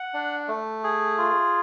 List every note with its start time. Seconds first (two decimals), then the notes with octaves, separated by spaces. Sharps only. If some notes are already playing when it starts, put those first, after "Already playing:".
Already playing: F#5
0.14 D4
0.48 A3
0.84 G#4
1.18 F4